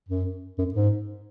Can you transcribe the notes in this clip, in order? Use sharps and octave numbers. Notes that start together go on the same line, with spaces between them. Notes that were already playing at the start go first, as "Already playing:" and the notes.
F#2
F#2
G#2